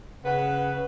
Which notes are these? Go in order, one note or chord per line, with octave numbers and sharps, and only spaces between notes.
C#3 B4 F#5